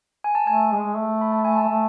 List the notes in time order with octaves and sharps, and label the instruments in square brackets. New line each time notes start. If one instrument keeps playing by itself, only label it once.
[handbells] G#5
A5
[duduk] A3 [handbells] G#5
[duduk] G#3
A3
[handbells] B5
A5
G#5
A5
[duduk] A3